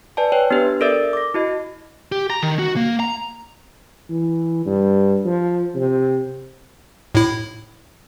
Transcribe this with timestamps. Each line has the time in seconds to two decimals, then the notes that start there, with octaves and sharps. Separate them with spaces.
0.17 B4 D5 G#5 A5
0.32 B4 C#5 G5
0.51 B3 D4 G4 B4
0.81 A4 A#4 D5 E5 E6 A6
1.13 D6 A#6
1.34 E4 F#4 D#5
2.12 G4
2.30 A#5
2.43 D#3
2.59 F#4
2.76 A#3
3.00 A#5
4.10 E3
4.66 G2
5.26 F3
5.75 C3
7.15 A2 E4